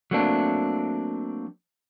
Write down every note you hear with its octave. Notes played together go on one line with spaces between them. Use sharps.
F#3 A3 A#3 C4 D4